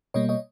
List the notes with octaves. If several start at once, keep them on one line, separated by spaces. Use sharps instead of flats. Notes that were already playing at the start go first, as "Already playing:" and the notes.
B2 G3 A#3 C#5 D#5
C#5 D#5